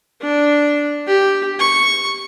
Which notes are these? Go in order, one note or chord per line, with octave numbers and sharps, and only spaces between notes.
D4
G4
C#6